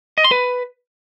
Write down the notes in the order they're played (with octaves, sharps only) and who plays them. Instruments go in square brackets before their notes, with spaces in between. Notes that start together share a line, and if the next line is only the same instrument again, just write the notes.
[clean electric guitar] D#5
C6
B4